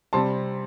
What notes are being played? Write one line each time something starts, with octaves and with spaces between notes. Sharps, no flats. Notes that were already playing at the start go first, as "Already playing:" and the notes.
C3 G3 C4 A5 C6